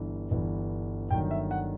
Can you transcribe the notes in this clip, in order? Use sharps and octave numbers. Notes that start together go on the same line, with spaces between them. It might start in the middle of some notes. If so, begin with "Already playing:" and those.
Already playing: G1 G2 E3
G1 G2 E3
G1 G2 D#3 F#3 G5
E5
F#5